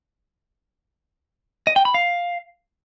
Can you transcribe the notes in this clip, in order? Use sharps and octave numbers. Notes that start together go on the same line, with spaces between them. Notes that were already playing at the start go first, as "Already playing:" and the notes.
D#5
G5
B5
F5